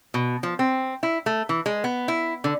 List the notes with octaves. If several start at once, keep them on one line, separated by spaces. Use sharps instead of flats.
B2
F3
C4
E4
A3
E3
G#3
B3
E4
D3